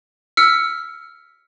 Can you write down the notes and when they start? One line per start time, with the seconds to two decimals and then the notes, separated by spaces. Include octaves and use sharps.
0.37 E6 F6 B6 C#7